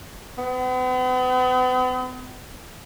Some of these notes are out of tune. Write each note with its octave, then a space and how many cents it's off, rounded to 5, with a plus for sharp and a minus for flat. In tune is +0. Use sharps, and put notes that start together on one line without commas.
B3 +45